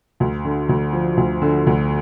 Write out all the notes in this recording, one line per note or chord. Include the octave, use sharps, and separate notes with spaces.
D2
D3
D2
F3
D2
D3
D2